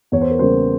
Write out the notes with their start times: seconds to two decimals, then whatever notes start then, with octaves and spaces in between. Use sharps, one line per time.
0.12 E2 C#5
0.21 C5
0.30 A#4
0.39 C#3 G3 A#3 C5